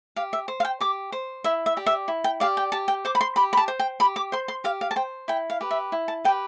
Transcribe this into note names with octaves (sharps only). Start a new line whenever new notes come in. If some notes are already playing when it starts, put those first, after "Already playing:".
G4 F5
E5
C5
F5
G5
G4 D6
C5
E4 E5
E5
G4 D5
E5
E4
G5
G4 D5 F5
G5
G4 A5
G5
C5 D6
B5
C6
G4 B5
B5
A5
C5
G5
G4 B5
D6
C5 C6
C6
G4 F5
F5
A5
C5 G5
E4 G5
F5
G4 B4
E5
E4
A5
G4 B4 G5